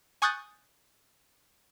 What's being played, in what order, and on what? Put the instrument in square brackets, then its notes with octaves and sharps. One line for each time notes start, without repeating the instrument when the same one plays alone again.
[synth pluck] G#5 C#6 D#6 F#6 G6 A6